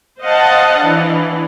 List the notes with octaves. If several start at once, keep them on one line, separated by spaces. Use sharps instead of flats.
C5 D#5 F5 F#5 A5
E3 D4